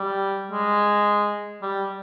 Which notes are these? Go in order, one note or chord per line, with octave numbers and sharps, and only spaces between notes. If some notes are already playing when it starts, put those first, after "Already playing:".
Already playing: G3
G#3
G3